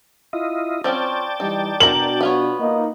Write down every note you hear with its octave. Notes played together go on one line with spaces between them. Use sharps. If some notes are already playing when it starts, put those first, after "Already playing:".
E4 F4 D#5
F3 C4 C#4 D5 G5 A5
E3 G3 D#4
B2 D4 F#4 A#4 A#5 F#7
B3 F4 C#5
A#3 D#4